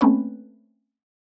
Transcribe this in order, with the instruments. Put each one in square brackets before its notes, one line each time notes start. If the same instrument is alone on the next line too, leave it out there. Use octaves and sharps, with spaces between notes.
[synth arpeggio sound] A3 A#3 C4 C#4 B4 C#5